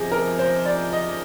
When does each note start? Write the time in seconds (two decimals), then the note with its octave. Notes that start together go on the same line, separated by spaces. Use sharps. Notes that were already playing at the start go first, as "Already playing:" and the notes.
Already playing: C3 F3 G#4 D#5
0.12 A#4
0.39 C5
0.65 D5
0.93 D#5